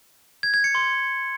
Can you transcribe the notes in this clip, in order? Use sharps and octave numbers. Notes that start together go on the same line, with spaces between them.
G#6
G#6
C#7
C6